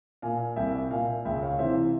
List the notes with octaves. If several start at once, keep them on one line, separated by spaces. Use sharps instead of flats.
A#2 F5 G#5
C2 E5 G5
A#2 F5 G#5
C#2 E5 G5
C#5 F5
C3 E3 C5 E5